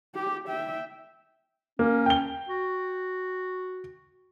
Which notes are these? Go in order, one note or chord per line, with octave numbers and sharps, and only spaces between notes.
G4
E5 G5
A#3 C#4
G5 G7
F#4